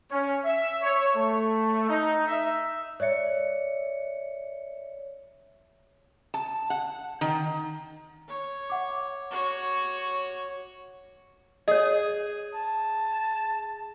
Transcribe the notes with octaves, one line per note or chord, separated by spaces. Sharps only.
C#4
E5
C#5
A3
D#4
E5
C#5 D5 E5 C#7
A5
F#5
D#3
C#5
E5 F#5 D6
F#4 C#5
G#4 C#5 D#5
A5